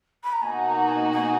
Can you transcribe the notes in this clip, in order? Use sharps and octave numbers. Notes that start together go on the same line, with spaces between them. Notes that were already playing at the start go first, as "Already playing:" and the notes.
B5
A#5
B2 A#3 D#4 F#4 G#5
A#5
G#5
G#5